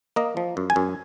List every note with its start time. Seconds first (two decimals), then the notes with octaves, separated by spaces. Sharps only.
0.16 A#3 D#5
0.37 F3
0.57 F#2
0.70 G#5
0.76 F#2